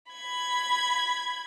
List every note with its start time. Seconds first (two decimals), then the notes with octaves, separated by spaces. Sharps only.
0.12 B5 G#6